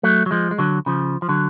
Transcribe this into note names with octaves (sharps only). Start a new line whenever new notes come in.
F#3 A3
F#3
F3 G#3
G#3
D3 F#3
C#3 F3
F3
D3 F#3